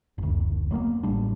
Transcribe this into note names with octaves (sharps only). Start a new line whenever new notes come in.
F#1 D2
F#3 G#3 A#3 B3
A1 C#3 G3 D4